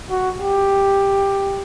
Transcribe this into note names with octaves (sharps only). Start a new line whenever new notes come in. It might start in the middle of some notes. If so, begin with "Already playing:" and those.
F#4
G4